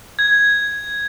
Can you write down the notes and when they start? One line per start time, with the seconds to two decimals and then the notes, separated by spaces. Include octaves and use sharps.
0.19 G#6